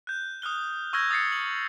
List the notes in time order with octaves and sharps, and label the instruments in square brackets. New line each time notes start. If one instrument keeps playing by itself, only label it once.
[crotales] F#6 G6
D#6 F6 F#6 G7
C#6 E6 F6 G6 G#6 A#6
D#6 A6 C7 C#7
F#7